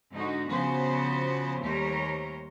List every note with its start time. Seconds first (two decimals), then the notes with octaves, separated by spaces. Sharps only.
0.12 G#2 D3 D#4 F#4
0.49 C#3 F3 B3 F#4 C5
1.61 D#2 G3 A3 A#4 C5 C#5